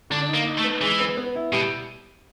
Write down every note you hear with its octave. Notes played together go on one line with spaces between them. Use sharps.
D3 D4
D#4
A#3
D#4
A3
B3
E3 G#3
B3
B3
E4
B2 G3